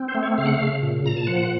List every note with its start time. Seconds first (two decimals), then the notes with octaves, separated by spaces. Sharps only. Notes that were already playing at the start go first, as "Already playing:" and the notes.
Already playing: C4
0.08 C5
0.15 A3
0.23 C#5
0.38 C#3 F5
0.46 F#5
0.54 F5
0.61 C#3
0.83 A#2
1.04 A#2 A#5
1.17 A5
1.27 F3 F#5